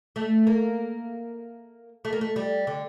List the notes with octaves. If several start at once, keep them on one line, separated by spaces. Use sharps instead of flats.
A3
A#3
A3
A#3
A3
G3
D3